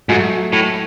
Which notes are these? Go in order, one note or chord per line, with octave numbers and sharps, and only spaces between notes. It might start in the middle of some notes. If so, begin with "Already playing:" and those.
G#2 F#3 A3
A2